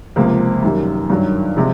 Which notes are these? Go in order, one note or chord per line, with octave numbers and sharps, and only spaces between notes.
C#2 C3 F3 A#3
F#2 D#3 G3
G2 D#3 F#3
C3 F3 G#3